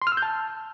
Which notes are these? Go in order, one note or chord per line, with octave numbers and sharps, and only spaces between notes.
C6
F6
E6
G6
A5